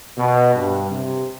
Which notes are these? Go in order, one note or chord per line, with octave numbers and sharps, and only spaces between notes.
B2
G2
C3